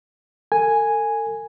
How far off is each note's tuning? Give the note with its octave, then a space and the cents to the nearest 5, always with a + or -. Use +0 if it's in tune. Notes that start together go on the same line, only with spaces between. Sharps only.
A4 +40 G#5 +0